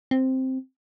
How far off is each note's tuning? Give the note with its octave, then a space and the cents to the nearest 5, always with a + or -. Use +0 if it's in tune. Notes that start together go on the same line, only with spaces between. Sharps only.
C4 +0